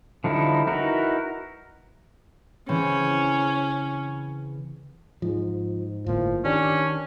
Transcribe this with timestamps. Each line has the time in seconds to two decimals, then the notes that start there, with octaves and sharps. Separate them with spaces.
0.24 D3 F3 G3 D#4 E4
0.67 D#4 E4 F#4 A#4 B4
2.69 C#3 E3 C4 C#4
5.22 G#2 F3
6.06 G1 A2 F3 A#3
6.45 D#3 C#4 D4 G4